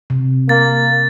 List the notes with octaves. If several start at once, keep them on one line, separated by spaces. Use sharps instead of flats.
C3
A#3 A6